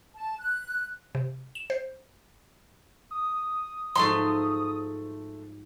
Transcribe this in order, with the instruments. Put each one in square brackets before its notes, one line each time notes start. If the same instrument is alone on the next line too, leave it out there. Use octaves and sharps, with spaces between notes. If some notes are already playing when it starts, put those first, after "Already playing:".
[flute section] A5
F#6
[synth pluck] C3
E7
C5
[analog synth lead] D#6
[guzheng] G#2 F3 F#3 [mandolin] A3 C6